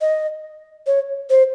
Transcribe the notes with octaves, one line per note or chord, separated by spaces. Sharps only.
D#5
C#5
C5